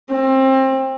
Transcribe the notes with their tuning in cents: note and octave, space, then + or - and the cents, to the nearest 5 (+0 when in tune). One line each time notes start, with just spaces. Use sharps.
C4 +25